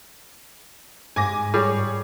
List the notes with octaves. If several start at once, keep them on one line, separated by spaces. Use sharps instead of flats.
G#2 G#5 D6 A#6
G3 G#4 C#5